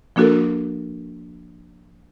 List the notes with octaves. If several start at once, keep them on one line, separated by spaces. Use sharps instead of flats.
F3 A#3 D4 F#4 A4 A#4